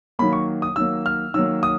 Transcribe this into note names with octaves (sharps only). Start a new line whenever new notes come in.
D#3 F#3 A#3 B5
C#6
D#6
D#3 F#3 A#3 E6
F6
D#3 F#3 A#3 E6
D#6